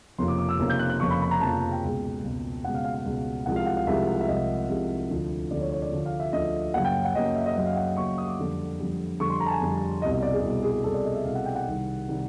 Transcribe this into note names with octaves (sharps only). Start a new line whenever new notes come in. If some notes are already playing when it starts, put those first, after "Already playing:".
F1 F2 C#3 F3 A#3 C6
D6
D6
E6
F1 F2 C#3 F3 A#3
G6
F#6
F#6
F1 F2 C#3 F3 A#3 C#6
B5
B5
A#5
F1 F2 C#3 F3 A#3 A5
A5
A5
G5
C#2 B2 G#3
C#2 B2 G#3
C#2 B2 G#3 F#5
F5
F5
F5
C#2 B2 G#3
C2 C3 F3 G#3 F#5
F5
F#5
F5
C2 C3 F3 G#3 E5
E5
C2 C3 F3 G#3 D#5
C2 C3 F3 G#3
D2 D3 F3
D2 D3 F3 D5
C#5
C#5
D5
D2 D3 F3
F5
E5
D2 D3 F3 D#5
F#2 C#3 F#3 A#3 F#5
G5
F#5
F#2 C#3 F#3 A#3 D#5
E5
D#5
F#2 C#3 F#3 A#3 D#5
F5
F#5
F#2 C#3 F#3 A#3 C#6
D#6
D6
F2 D3 G3
F2 D3 G3
F2 D3 G3 C#6
C6
A#5
A5
G#5
F2 D3 G3
C2 B2 G3 D#5
D#5
D5
G#4
C2 B2 G3
G#4
C2 B2 G3 A4
D5
D#5
E5
C2 B2 G3 F5
F#5
G5
F#5
C2 C3 D#3 G3
C3 D#3 G3